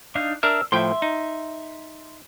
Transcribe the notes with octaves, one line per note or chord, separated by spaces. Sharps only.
D4 D#4 F5
D4 A#4 E5 E6 F6
A2 F3 E5 G5 C6
D#4